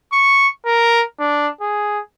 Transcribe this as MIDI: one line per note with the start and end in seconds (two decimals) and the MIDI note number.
0.12 0.48 85
0.65 1.03 70
1.19 1.48 62
1.61 1.99 68